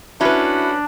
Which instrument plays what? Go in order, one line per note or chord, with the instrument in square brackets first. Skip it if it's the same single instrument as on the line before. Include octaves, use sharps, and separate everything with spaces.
[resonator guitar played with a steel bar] C#4 B4 [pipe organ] D4 [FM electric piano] E4 B5 [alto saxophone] F#4